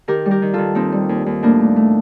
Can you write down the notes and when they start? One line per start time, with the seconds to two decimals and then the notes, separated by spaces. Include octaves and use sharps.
0.08 D#3 G4 A#4
0.26 G3
0.31 G4 A#4
0.42 D#3
0.54 D#3 F4 A4
0.75 D#2 C4 D#4
0.92 G3
1.09 D#2
1.26 D#2
1.43 A2 A#3 D4
1.60 A3
1.76 A3